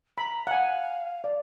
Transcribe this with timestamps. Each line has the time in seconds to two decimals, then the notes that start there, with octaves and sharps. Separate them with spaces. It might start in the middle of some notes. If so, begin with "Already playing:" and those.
0.18 A#5 B5
0.47 F5 F#5 G#5
1.24 D5